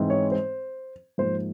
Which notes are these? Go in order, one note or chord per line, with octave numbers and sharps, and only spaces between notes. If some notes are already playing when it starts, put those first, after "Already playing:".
Already playing: G#2 E3 G#3 C4
C#5
C5
G#2 F3 A#3 C5